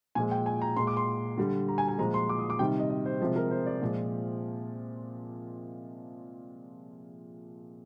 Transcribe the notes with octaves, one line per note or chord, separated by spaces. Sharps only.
A#2 F3 G#3 G#5
G5
G#5
A#5
A#2 G#3 C6
D6
C6
D3 G3
A#5
G#5
G#5
A#2 F3 G#3 A#5
C6
D6
D#6
D6
C3 D#3 G3 G5
D#5
D#5
C5
C3 F3 G#3
A#4
C5
D5
A#2 F3 G#3